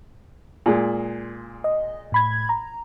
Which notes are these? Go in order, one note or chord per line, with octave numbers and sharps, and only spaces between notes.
A#2 G#3
D#5
A2 B5 G#6
A#5